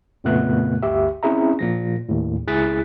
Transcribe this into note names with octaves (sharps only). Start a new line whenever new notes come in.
F2 A#2 C#3 A3 B3 F#6
G1 D2 G4 E5
C4 C#4 E4 G#4 E5 A#5
A#2 F3 A#6
D#2 A2
C#2 E4 G#4 F#6 A6 B6